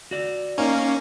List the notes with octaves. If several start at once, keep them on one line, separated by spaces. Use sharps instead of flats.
F#4 D5
A#3 C#4 D#4